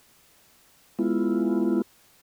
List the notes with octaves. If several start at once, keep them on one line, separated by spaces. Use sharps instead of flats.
G#3 B3 E4 F4